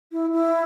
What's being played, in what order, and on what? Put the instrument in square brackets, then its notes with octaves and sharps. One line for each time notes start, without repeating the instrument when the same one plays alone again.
[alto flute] E4
E4